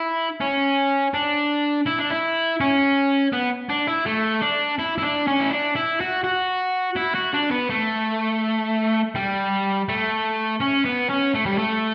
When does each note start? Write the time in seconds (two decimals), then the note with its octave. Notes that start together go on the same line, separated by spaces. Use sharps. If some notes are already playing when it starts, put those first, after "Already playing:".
Already playing: E4
0.41 C#4
1.14 D4
1.87 E4
1.99 D4
2.11 E4
2.61 C#4
3.33 B3
3.70 D4
3.87 E4
4.06 A3
4.42 D4
4.79 E4
4.98 E4
5.03 D4
5.27 C#4
5.40 E4
5.51 D4
5.76 E4
6.00 F#4
6.24 F#4
6.96 E4
7.15 F#4
7.34 D4
7.51 B3
7.70 A3
9.15 G3
9.89 A3
10.61 C#4
10.85 B3
11.09 C#4
11.34 A3
11.46 G3
11.58 A3